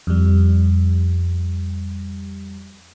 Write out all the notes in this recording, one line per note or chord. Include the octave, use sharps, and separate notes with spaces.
F2 G3